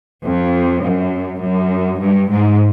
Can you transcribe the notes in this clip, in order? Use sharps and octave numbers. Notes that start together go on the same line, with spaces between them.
F2
F#2
F#2
G2
G#2